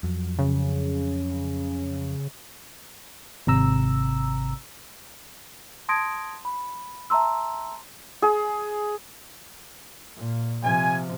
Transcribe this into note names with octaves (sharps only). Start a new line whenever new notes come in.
F2 F#3
C#3
G#1 C3 A#5 E6
A5 C6 D#6 G#6 A#6 D7
B5
E5 A5 A#5 C6 E6
G#4
A#2
C3 F3 G#5